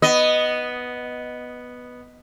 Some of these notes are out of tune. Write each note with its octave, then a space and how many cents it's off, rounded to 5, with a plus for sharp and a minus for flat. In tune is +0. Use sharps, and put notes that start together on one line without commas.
B3 +0 D#5 +0